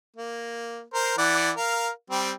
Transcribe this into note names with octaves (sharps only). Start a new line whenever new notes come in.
A#3
A#4 C5
E3 D5 F#5
A#4 F5
G3 C4